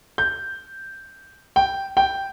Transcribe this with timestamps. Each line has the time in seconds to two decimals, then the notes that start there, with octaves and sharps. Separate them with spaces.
0.18 G6
1.56 G5
1.97 G5